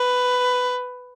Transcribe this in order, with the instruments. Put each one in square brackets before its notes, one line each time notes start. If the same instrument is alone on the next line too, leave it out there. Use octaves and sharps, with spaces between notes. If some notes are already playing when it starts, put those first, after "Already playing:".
Already playing: [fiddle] B4